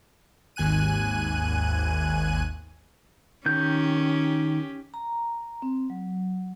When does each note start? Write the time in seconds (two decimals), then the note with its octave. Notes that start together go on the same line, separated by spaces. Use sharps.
0.56 G#1 D#2 G#5 F#6 D#7
3.46 D#3 C#4 G4 G6
4.94 A#5
5.62 C4
5.90 F#3